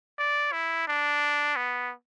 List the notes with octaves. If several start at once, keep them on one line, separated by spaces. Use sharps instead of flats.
D5
E4
D4
B3